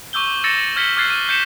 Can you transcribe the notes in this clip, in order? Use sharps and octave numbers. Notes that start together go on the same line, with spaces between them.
C#6 D6 E6 G6 G7
E6 A6 A#6 C#7 E7
F6 G#6 B6 C#7 G7
D6 F6 F#6 G#6 A6 C7
D#7
G6 B6 C#7 E7